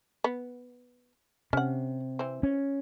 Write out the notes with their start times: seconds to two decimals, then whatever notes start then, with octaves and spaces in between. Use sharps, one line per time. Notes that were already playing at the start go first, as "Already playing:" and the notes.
0.24 B3
1.53 C3 C#4 F#5
2.19 E3 C4
2.43 C#4